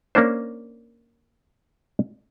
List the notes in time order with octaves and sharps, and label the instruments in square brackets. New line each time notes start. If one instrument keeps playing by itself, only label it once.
[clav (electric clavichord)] A#3 C#4 D4 C5